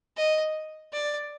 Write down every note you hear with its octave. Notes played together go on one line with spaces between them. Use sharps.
D#5
D5